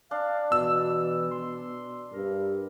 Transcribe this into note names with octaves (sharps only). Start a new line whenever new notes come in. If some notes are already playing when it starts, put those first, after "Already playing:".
D4 F5
B2 E3 E6
C6
G2 A#4